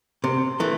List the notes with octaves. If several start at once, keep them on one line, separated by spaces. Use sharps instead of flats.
C3
E3 A3